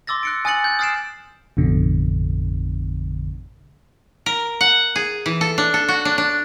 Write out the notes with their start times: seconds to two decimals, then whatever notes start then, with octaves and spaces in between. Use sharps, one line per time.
0.07 C6 D6 E6 A6 A#6
0.23 F#6 C#7 D7
0.45 G#5 D#6 F#6 A6 C#7 F#7
0.64 F#6 G6
0.79 D#6 F6 A6 C7 D7 E7
1.57 A1 F2 B2 D3
4.26 A#4
4.61 F#5
4.96 G#4
5.26 E3
5.41 A4
5.58 D4
5.74 A4
5.88 F#4
6.05 D4
6.18 D4